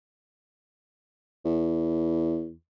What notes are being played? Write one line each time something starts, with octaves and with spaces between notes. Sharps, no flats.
E2